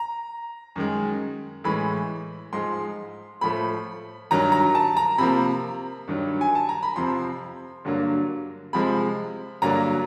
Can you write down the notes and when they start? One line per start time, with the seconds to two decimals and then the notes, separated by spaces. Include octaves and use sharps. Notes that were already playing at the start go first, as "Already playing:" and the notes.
Already playing: A#5
0.76 F#2 D#3 G#3
1.64 A2 E3 G#3 B5
2.53 G#2 F3 G#3 C6
3.41 A2 F3 A3 B5
4.31 G2 D#3 F#3 A#5
4.52 A#5
4.75 A5
4.97 A#5
5.18 C3 F3 A#3 B5
6.08 G2 D#3 F#3
6.41 G#5
6.55 A5
6.69 A#5
6.83 B5
6.96 F2 C3 F3 C6
7.85 G2 D3 F#3 A#3
8.73 C3 F3 G#3 B5
9.62 G2 D3 F#3 A#3 A#5